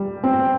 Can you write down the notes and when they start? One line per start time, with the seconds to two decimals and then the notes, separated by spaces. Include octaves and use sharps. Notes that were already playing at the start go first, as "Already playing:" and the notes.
Already playing: G3
0.24 C4